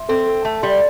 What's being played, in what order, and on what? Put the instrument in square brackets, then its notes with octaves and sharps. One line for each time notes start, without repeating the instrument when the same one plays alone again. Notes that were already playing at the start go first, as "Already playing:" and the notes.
Already playing: [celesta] E5 C6
[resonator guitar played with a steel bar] C4 [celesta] A4
[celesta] A4
[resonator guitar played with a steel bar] A3 [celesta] E5
[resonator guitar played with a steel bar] G3 [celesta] C6